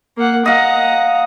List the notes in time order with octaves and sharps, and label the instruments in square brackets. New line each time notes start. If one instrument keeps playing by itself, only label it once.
[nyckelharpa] A#3 F#5
[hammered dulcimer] D#5 F5 [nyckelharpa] F#5 A#5